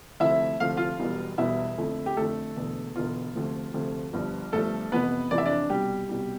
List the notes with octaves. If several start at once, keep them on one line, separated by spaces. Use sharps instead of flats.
D2 C3 F3 A3 E4 E5
D2 C3 F3 A3 F5
F4 F5
E1 E2 B2 G3
E1 E2 B2 G3 E4 E5
F2 D3 A3
G4
F2 D3 A3 A4
E1 E2 D3
E1 E2 D3 F4
D2 C3 F3 A3
D2 C3 F3 A3
G1 G2 F3
G1 G2 F3 A3 A4
F1 F2 E3 B3 B4
F1 F2 E3 D5
E5
D4 D5
C2 B2 G3 G4
C2 B2 G3